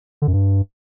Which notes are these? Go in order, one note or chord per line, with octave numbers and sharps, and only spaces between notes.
D3
F#2
G2